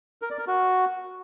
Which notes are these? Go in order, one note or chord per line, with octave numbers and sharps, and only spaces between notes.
A#4
D5
A#4
F#4